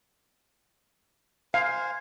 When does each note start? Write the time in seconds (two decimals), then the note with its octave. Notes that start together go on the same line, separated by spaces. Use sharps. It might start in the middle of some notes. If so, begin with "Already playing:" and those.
1.54 C5 F5 G#5